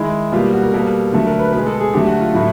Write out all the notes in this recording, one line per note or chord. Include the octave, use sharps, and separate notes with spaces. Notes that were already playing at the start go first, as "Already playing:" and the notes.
Already playing: D#3 G#3 E4
B2 G3 A#3 F4
F#4
A#4
B2 G3 A#3 A4
D3 F#3 A3
A#4
B4
B2 G#3 B4
A4
G#4
D3 F#3 A3 G4
F#4
F4
A2 F#3 A3 E4